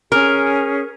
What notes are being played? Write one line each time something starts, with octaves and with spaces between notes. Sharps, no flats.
C#4 G#4 A#4